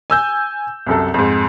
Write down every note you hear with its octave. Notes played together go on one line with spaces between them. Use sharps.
G#5 E6 G6
C2 F#2 A4
F2 G#2